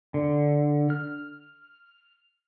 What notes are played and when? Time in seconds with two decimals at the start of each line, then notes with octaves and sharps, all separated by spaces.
0.14 D3
0.90 F6